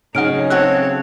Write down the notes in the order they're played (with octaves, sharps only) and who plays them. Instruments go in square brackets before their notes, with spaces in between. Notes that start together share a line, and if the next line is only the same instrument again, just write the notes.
[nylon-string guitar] C#3 F#3 [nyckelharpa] D#4 G#4 [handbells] F#5 F6 D7
[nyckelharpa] C4 C#5 [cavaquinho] F#4 A4 E5 [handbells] F#6